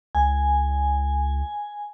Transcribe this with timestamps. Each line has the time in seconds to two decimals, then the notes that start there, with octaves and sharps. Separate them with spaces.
0.15 C#2 G#5